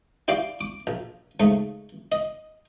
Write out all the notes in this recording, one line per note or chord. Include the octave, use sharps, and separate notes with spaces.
E4 G4 D5 F5 D6
D6
A#1
G#2 C#3 A3
D#5